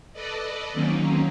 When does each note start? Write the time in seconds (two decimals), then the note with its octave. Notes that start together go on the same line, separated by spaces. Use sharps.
0.13 A4 B4 D5 D#5
0.72 D#3 F#3 A#3 C4 C#4 D#4